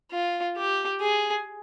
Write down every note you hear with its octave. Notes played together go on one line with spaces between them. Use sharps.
F4
G4
G#4